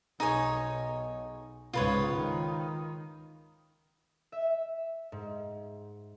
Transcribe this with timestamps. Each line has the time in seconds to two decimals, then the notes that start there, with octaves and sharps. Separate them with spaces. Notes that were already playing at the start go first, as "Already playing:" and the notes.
0.20 B1 D#4 G#4 C#5
1.73 C#2 G#2 F4 B4 C#5
2.15 D#3
4.32 E5
5.12 G#2